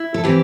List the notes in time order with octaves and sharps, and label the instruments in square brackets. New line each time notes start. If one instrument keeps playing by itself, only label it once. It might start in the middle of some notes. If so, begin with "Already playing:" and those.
Already playing: [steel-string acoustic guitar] E4
A4
E3 C4 G4